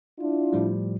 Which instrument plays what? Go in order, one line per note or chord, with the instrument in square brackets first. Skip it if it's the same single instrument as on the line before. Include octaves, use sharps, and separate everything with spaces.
[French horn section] D4 E4 F4
[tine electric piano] A2 F3 G3